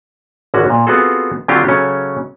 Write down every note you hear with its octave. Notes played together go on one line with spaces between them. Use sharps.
G#1 D3 C#4 F#4
A#2
B3 C4 F4 F#4 G#4 A4
D3 F#3 C4 D4 F4 G4
C#3 F#3 C#4 A4